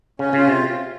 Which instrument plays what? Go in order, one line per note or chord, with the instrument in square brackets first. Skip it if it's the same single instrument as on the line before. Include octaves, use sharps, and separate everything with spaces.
[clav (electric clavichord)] C#3 [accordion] C#4
[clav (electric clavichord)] C#3 [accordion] F4
[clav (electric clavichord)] C3